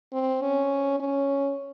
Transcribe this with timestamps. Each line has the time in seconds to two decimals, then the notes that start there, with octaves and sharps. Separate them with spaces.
0.13 C4
0.42 C#4
1.00 C#4